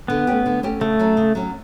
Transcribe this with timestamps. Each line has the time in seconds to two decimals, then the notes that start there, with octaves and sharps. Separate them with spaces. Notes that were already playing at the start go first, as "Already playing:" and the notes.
0.08 D3 B3
0.27 A3 C#4 G4
0.46 D3
0.63 A3 C#4 G4
0.81 C#3 A3
0.99 F#3 C#4
1.17 C#3
1.35 F#3 C#4